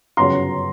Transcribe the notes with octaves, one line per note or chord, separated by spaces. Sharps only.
G1 F#2 C#3 F#3 A#5 C6